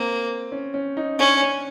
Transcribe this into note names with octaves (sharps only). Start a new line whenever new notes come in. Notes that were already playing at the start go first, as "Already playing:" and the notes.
Already playing: A#3 C4
C#4
C#4
D#4
C#4 D4
C#4